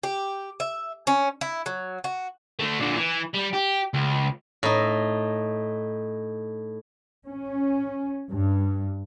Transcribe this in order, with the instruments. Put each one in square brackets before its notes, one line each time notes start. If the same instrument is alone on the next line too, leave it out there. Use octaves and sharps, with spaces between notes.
[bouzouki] G4
E5
C#4
E4
F#3
F#4
[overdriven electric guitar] D3 A3
A#2 D3
E3
G3
G4
C#2
[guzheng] A2 D#4
[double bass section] C#4
G2